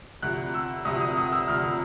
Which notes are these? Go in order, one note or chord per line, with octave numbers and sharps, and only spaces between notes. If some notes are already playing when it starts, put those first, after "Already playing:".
D2 C3 F3 F#6
E6
D2 C3 F3 D#6
D#6
D#6
E6
D2 C3 F3 F6